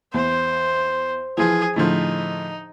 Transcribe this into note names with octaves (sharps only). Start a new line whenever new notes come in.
E2 C5
E3 F3 G#4
A2 D3 F3 D#4